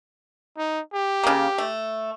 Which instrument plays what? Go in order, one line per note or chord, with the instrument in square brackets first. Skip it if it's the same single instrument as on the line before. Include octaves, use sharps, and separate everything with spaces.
[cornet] D#4
G4
[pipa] C#3 A#3
A3